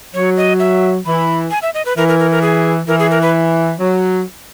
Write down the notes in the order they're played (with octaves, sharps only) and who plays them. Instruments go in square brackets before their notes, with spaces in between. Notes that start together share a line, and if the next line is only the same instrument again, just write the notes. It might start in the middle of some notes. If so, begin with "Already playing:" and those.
[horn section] F#3 [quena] C#5
[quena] D#5
E5
[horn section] E3 [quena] B5
[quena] G#5
E5
D#5
B4
[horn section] E3 [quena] A#4
[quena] A#4
A#4
A#4
G#4
[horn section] E3 [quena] A#4
[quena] G#4
A#4
B4
[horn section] F#3